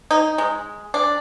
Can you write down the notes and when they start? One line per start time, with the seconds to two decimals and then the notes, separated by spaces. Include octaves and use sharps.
0.11 D#4
0.38 G#3
0.94 D4